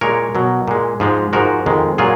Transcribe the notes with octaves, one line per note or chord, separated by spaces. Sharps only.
A#2 G#3 A#4 C#5
B2 F#3
A#2 G#3
G#2 F3 G#3
G#2 F3 G#3 F#4 A#4
F2 D#3 G#3
A#2 F#3 F4 G#4